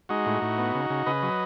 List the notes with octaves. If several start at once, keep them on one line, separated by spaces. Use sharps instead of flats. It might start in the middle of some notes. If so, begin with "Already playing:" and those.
G#3 D#4 F#4
A2
A2
B3
C#3
C#3
C#3 B4 D#5
F#3